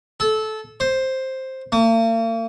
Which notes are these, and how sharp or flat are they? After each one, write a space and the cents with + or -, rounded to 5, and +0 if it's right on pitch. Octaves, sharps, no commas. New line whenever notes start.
A4 -20
C5 +5
A#3 -45